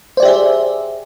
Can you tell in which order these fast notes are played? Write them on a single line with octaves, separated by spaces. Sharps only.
C5 D5 G4 E5 G#4